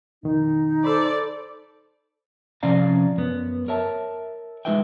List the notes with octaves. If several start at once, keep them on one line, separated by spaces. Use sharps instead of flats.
F2 B2 D#3 D#4
A4 C5 D5 B5 C6 E6
C3 F3 C#4 D5 F5 A#5
F#2 B3
A#4 C#5 E5 A5
G#3 D#4 F4 B4 E5 G5